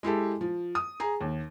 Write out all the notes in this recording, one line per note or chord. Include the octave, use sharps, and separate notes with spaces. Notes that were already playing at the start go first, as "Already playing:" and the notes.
G#3 E4 G4 A4
F3
D#6
G#4 A#5
D#2